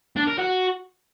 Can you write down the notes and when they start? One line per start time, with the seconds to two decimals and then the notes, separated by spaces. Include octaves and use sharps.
0.16 D4
0.27 A#4
0.39 F#4